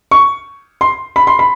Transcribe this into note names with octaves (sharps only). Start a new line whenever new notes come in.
C#6
C6
B5
C6
B5